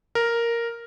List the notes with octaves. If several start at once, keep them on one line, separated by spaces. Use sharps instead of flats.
A#4